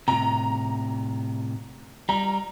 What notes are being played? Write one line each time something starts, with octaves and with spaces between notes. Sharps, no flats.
A2 C3 A#5
G3 A#5